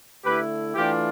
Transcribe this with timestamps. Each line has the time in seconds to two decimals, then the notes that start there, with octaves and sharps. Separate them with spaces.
0.25 D3 A3 E4 G4 B4
0.75 E3 A3 D4 F4 G4